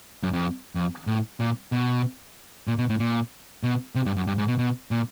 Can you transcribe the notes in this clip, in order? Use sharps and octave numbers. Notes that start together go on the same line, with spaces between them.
F#2
F2
F2
A2
A#2
B2
A#2
B2
A2
A#2
B2
C3
G2
F#2
G2
G#2
B2
B2
A#2